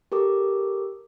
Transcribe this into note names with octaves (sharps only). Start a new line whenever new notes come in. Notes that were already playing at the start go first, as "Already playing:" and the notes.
G4 A4 A#4 D6